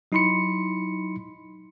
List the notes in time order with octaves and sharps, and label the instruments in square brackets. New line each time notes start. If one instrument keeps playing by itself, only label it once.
[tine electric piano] F#3 D#4 E4 B5 C6 C#7